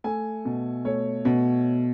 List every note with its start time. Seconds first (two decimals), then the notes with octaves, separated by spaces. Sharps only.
0.04 A3 G#5
0.45 B2
0.85 A3 C#5
1.25 B2